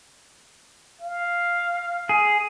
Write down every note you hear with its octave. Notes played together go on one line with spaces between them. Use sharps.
F5
G#4